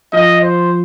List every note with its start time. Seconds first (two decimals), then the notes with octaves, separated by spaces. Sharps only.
0.13 F3 D#5
0.42 C5